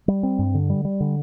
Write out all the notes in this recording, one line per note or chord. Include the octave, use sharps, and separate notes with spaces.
G3
C4
G2
D3
G3
G3
D3